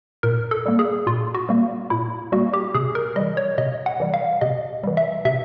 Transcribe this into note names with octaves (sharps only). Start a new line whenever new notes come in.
A#2 A#4
A4
G3 A#3
G#4
A#2 F4
F#4
G3 A#3
A#2 E4
G3 A#3 F#4
G4
C3 G#4
A#4
E3 G3 D#5
C#5
C3 D#5
F#5
E3 G3
F5
C3 D#5
E3 G3
E5
C3 E5